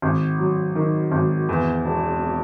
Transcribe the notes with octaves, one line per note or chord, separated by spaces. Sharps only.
G#1
F#3
D#3
G#1
E2
E1